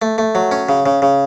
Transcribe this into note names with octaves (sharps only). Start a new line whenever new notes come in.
A3
A3
F#3
C#4
C#3
C#3
C#3